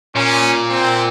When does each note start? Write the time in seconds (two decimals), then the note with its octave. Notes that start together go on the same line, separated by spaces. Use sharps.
0.15 A#2 C#4
0.69 C4